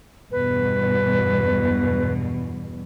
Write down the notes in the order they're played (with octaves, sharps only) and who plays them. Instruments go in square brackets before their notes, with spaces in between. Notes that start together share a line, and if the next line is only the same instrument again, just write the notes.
[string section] E2 G2 B2 [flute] B4